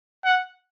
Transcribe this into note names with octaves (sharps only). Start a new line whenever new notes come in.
F#5